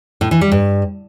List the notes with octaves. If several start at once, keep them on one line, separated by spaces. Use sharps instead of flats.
A2
E3
G3
G2